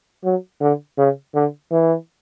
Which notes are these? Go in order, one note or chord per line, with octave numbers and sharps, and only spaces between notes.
F#3
D3
C#3
D3
E3